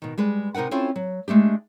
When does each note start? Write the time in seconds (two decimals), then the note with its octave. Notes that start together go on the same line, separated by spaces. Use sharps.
0.02 B2 D#3
0.18 G3 G#3 B4
0.55 C3 D#4 A#4 B4 F#5
0.71 C4 C#4 E4 F4 A4
0.96 F#3
1.28 G#3 A3 D4 G4